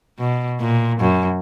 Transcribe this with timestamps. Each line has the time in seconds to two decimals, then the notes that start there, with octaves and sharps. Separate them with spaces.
0.19 B2
0.61 A#2
1.00 F#2